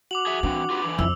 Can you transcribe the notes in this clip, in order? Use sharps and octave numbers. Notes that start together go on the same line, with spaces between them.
F#4 D6 F7 F#7
G#4 E5
E3 A#3 C4 D4
F4 G4 B4
D3 E3
F2 E4 E6